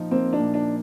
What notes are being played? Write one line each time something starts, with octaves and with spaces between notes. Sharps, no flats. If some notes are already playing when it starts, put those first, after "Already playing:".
Already playing: A#2 F3 D#4
A#3 C4
D4
A#2
D4